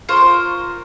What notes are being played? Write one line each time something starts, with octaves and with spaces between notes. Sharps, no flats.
F4 A#4 C5 C#6